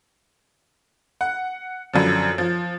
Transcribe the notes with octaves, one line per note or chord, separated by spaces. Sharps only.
F#5
F#2 D3 F3
F3